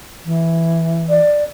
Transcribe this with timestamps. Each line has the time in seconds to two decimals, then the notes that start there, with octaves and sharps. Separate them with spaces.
0.25 E3
1.09 D5